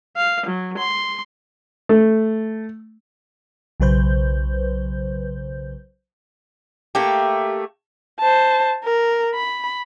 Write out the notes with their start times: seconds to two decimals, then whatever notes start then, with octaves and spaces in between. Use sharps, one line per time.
0.16 F5
0.46 F#3
0.78 C6
1.89 A3
3.80 B1 C#3 F#3 B4 C5 G6
6.95 A3 A#3 G4
8.19 C5 A5
8.83 A#4
9.34 B5